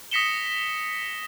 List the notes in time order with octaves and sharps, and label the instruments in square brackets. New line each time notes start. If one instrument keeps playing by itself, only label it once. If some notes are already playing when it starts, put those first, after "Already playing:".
[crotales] D#6 A#6 B6 C#7 E7 G7